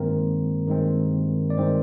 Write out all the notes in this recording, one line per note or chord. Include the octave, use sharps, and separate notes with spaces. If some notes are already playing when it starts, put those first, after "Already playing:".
Already playing: G2 D#3 G#3 A#3 C4 A#4
G2 D#3 G#3 C4
D5
G2 D#3 G#3 C4 C5